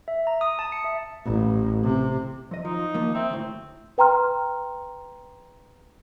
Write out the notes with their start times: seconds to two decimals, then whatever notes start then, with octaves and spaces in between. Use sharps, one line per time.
0.08 E5
0.27 A#5
0.41 D#6
0.59 A5
0.72 C#7
0.84 E5
1.26 A1
1.84 C3
2.51 F2 D#5
2.65 F3 D#4
2.94 F3 A#3 F4
3.15 C4 E5
3.30 D2 A2
3.98 B4 G5 A#5 C6 F6